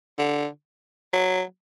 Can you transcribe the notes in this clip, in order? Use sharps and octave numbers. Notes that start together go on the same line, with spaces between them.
D3
F#3